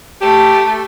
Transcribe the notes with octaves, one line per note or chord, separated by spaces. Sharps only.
A3 G4 A4